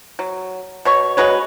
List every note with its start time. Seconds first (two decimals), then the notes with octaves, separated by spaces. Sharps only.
0.19 F#3
0.85 B2 C#5 C#6
1.17 G#3 F#4 B4 C#5